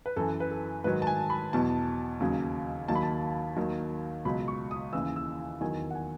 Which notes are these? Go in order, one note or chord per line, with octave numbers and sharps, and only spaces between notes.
B4
F#2 E3 A4
B4
A4
G#2 D#3 F#3 B4
A5
G#5
B5
E2 B2 F#3 A5
D#2 C#3 F#3
D#2 D#3 F#3 A5
B5
A5
D#2 D#3 F#3
C#2 B2 F#3 B5
C#6
D#6
D#2 C#3 E3 E6
E6
E2 D#3 F#3 G#5
F#5
G#5